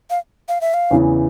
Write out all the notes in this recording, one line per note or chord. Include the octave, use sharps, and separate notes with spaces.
F5
F5
E5
F5
E2 C#3 E3